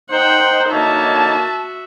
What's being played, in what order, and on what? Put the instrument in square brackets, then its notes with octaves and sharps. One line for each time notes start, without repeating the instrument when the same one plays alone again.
[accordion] D#4 [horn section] C5 [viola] F#5 G5
[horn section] D3 A#3 C#5 [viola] F#4 E5 [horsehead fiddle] A5